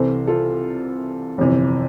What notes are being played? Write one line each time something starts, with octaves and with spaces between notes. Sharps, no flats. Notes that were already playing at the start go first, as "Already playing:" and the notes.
Already playing: C2 C3 E3 A4 C5
F4 A4
G1 F2 C3 E3